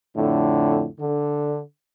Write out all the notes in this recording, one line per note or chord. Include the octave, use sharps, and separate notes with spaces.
F2 A2 D3
D3